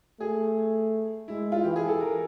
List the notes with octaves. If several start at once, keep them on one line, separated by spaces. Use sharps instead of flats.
A3 G#4
G#3 E4
F4
E3 G4
G#4
A4
A#4